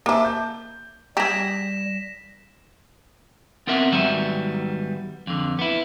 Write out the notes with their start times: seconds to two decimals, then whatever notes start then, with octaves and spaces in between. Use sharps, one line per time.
0.06 A#3 C5 E5 A5 D6
0.25 G6
1.17 G3 G4 G#4 A#6 B6 E7
3.67 B3 C4 A#4 E5 F#5
3.92 G#2 D#3 F#3 G3 B3 E5
5.27 F2 D3
5.59 B3 E4